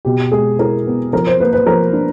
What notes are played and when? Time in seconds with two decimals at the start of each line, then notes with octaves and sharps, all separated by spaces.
0.05 B2 G4
0.32 G#3 G#4
0.58 E4 A#4
0.86 B3
1.13 F3 A#4
1.27 C5
1.40 A#3 B4
1.53 B4
1.66 F3 A#4
1.93 D4